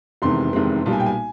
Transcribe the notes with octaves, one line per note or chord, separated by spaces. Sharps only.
F1 E2 C3 D#3 G#3 C6
F1 E2 C3 D#3 G#3
B1 A#2 G3 A5
G#5
G5
G#5